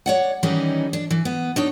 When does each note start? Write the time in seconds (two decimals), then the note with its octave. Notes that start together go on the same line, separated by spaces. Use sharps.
0.06 C#5 D5 F#5
0.43 D#3 E3 G3 C#4 D#4 E4
0.93 D4
1.10 E3
1.25 B3
1.56 D4 D#4 C#5